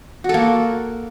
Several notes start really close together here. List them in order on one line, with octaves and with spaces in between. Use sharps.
F#4 A4 A#3